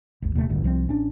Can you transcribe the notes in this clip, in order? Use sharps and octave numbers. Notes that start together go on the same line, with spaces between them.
G#1 D#2
D#1 D#2 C3 A3
D1 A1 D2 G2
C2 F3 G3 C4
A1 C#4 D4